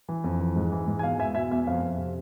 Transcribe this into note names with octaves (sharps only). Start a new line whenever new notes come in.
E3
F2
E3
G#2
E3
G#2
G#5
B2 F5
E2 E5 G#5
B2 E5 G#5
E2 E5
F2 F5
F2
C3